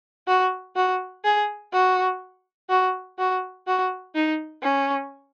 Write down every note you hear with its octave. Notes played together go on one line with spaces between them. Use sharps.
F#4
F#4
G#4
F#4
F#4
F#4
F#4
D#4
C#4